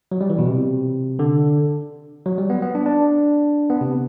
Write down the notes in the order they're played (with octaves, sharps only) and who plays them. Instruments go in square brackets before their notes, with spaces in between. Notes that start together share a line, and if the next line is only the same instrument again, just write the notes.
[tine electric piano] F#3
G3
E3
B2
C3
D3
F#3
G3
B3
B3
D4
D4
B3
C3